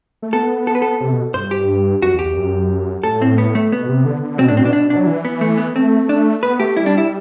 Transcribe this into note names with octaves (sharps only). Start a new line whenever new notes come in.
A3
B3 A4
A4
B4
A4
C3
B2
G2 C5
G4
F#2 F#4
E2
G4
E2
F#2
A2 A4
C4
B3
A3
B2 B3
C3
D3
D3
B2 C4
A2 D4
C4
B2 D4
D4
D4
F#3
E3
B3
A3
B3
A3 C4
D4
B3 B4
A3 G4
G3 E4
D4
E4